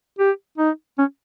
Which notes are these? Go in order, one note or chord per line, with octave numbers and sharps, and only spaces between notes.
G4
D#4
C#4